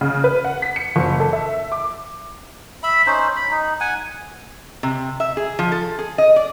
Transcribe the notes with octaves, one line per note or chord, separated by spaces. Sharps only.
C#3
B4
F#5
B6
C#7
F#1
A4
E5
D6
E5 B5
C#4 D#4 C5
B5
D#4
F#5 G#5
C3
E5
G#4
F3
A4
G#4
D#5
D5